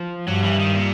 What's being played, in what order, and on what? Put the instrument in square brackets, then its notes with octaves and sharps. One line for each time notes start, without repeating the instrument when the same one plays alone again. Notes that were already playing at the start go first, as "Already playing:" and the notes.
Already playing: [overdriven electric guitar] F3
[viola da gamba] G2 [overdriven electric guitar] F#3
[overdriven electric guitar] E3
D#3
A#2